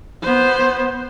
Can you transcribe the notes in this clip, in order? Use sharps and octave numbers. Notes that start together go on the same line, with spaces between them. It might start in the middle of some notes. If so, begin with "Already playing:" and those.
B3 C5